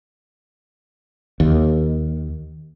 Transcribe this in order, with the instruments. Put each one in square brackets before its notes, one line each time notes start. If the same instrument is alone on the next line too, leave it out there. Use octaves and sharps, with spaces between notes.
[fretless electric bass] D#2